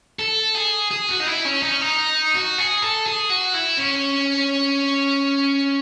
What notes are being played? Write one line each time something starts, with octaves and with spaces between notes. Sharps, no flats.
A4
G#4
G#4
F#4
D#4
E4
C#4
D#4
C#4
D#4
F#4
G#4
A4
G#4
F#4
E4
C#4